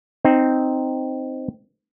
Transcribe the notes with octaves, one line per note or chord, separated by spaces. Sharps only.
C4 D#4